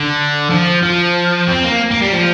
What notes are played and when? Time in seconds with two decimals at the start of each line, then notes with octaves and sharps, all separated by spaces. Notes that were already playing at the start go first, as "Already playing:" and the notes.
Already playing: D3
0.50 F3
0.83 F3
1.47 C4
1.64 A#3
1.91 A#3
2.02 G3
2.13 F3